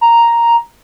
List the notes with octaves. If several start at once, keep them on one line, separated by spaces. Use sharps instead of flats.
A#5